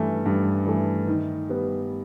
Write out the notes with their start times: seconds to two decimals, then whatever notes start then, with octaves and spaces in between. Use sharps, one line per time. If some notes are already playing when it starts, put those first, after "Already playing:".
Already playing: G2 E3 A3
0.26 G2
0.66 E3 A3
1.07 D#3
1.49 G3 B3